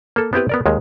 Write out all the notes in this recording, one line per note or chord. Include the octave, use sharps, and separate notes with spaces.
A#3 A4
B3 C4 E4 G4 B4
B3 A#4 D5
D#2 D#3 G#3